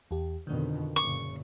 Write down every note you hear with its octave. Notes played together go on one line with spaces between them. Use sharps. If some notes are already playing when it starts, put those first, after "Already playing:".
E2 G4
F2 B2 D3 D#3 D4
F#1 A#2 C#3 C#6